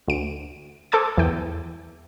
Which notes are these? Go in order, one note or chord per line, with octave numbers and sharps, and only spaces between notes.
D2 D7
A4 C5 A5 D6 D#6 G#6
E2 G5